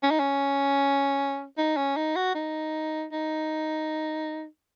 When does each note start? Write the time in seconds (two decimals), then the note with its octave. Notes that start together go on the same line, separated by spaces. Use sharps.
0.03 C#4
0.11 D#4
0.19 C#4
1.58 D#4
1.77 C#4
1.97 D#4
2.16 F#4
2.35 D#4
3.12 D#4